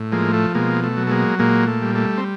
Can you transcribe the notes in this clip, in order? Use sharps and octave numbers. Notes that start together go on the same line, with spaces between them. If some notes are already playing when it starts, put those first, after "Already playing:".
Already playing: A2
F3 G#3 A#3
A3
B2 G#3 A#3
A3
F#3
A3
G#3 A#3
A#2 G#3 A#3
A3
G3
A3
C4